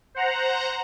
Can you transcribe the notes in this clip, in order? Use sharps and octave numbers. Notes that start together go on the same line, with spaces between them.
C5 F#5 A#5